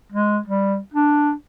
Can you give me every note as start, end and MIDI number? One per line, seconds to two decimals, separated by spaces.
0.12 0.39 56
0.48 0.78 55
0.94 1.32 62